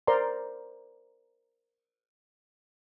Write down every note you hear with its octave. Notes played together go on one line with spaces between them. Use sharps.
A#4 C5 D5 A#5 C6